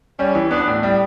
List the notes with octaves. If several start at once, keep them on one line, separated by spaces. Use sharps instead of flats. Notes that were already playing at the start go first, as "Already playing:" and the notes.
G3 C#4
E3
B3 D4
A2
G3